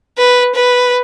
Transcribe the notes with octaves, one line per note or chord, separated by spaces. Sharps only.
B4
B4